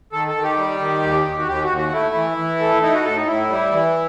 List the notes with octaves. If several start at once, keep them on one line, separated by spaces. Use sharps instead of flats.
D#3 A4
A4
D#3
G4
G3
D#3
D#2
D#2
F#4
D#2 G4
F#4
D#2
F#4
A3 E4
E3
E3
A3
D#4 E4
F#4
A2 A4
D#4
A2 E4
G3
E3